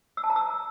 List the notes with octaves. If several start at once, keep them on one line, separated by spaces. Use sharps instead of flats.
E6
A5
A#5
E6